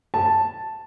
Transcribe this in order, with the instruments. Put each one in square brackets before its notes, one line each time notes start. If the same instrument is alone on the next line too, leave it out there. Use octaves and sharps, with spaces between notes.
[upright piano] A5